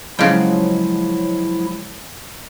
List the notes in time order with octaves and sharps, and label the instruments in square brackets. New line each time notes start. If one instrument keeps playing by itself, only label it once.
[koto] C#3 G5 [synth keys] F3 F#3 G#3 [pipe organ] E4